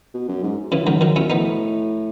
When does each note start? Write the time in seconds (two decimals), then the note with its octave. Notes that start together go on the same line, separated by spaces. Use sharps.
0.14 B2
0.28 F#2
0.43 G#2
0.72 F#2 C#3 E3
0.85 G#2 D#3 F#3
0.99 F#2 D#3 F#3
1.16 B2 C#4 E4
1.30 A2 B3 D#4